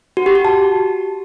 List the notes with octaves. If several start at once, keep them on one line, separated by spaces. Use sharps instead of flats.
F#4
G4
F#4
A5